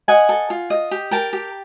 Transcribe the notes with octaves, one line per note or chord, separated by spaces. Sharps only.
D#5 F#5 G#5
A4
F4
D#5
G4
A#4 G5 A5
G4